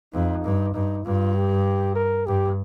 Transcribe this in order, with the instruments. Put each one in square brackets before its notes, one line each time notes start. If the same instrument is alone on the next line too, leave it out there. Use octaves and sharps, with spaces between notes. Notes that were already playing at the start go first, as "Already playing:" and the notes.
[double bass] F2 [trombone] D#4
[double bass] G2
[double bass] G2 [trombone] D#4
[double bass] G2 [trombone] F4
[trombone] G4
A#4
[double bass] G2 [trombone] G4